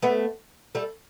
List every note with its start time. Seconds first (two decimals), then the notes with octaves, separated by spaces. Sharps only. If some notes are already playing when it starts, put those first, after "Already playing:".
0.02 A3 B3
0.75 G3 A3